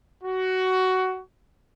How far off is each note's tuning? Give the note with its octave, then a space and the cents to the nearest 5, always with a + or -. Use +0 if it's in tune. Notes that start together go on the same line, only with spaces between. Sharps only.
F#4 +15